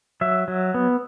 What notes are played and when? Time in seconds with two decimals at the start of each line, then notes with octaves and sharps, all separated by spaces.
0.21 F#3 E5
0.48 F#3
0.74 B3